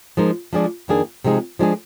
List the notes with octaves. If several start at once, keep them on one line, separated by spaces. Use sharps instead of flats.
F3 G#3 D#4 A#4
F3 G#3 D4 G#4 D5
F2 D#3 A#3 D4 G#4
C3 F3 G#3 D#4 G#4
F3 G#3 D4 F4 G#4